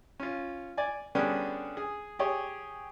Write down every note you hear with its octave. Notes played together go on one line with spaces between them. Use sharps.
C#4 F4
D5 G#5
D3 G3 B3 C#4 D4 G#4
G#4
G4 G#4 C#5